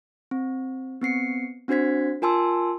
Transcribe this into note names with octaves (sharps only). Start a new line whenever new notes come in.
C4
B3 C4 C7 C#7
C4 D4 F#4 C5 G#6 B6
F4 A#4 G#5 A5 C6 E6